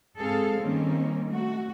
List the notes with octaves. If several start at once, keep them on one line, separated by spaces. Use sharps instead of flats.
G#2 C4 G#4 A4 F5
D#3 G3 A#3 C4 C#4
A3 F#4